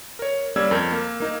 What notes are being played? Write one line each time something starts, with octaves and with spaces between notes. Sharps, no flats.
A#4 C#5
G3 A#3 C#4 D5 E6 G#6
F2 A#4 G6 G#6
A#3
A#3 D#4 A#4